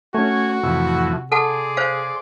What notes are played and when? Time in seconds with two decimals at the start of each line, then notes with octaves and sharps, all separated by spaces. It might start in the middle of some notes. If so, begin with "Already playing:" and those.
0.15 A3 C#4 F#4 C#5 G#5
0.63 F2 A2 C3 E3
1.32 G#4 A4 D5 F#5 A5 C6
1.77 C5 C#5 F5